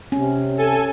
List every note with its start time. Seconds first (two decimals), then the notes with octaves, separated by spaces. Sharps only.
0.12 C3 C#4
0.57 A4 G#5